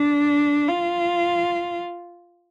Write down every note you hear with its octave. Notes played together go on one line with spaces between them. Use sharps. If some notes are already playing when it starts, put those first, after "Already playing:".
Already playing: D4
F4